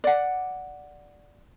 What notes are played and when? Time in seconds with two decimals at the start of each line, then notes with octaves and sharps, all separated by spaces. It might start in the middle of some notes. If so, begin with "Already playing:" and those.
0.04 D5 F#5